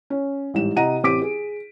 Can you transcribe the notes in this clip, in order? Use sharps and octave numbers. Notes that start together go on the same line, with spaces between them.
C#4
A1 G#2 G3 E7
C3 E4 D#5 F#5 A#5 D#7
A1 C4 G4 D6 B6 D7
G#4